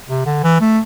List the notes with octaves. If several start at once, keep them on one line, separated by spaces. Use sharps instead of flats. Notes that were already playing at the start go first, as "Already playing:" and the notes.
C3
D3
E3
A3